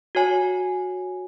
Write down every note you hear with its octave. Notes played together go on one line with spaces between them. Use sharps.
F#4 C#5 G#5